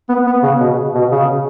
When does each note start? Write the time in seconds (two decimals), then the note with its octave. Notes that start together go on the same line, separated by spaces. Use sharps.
0.09 B3
0.26 B3
0.43 C#3
0.60 B2
0.95 B2
1.11 C#3